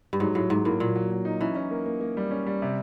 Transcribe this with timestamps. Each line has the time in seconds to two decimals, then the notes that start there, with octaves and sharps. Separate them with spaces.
0.13 G2
0.20 G#2 F#3
0.35 A2 F#3
0.50 G#2 F#3
0.65 A2 A#3
0.80 A#2 F#3
0.96 F#3
1.11 F#3
1.25 D#4
1.41 E3 C#4
1.55 C#4
1.71 A#3
1.86 A#3
2.01 A#3
2.17 G3
2.31 C#4
2.46 G3
2.62 C3